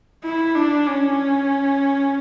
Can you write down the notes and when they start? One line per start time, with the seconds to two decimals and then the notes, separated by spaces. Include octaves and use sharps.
0.24 E4
0.55 D4
0.87 C#4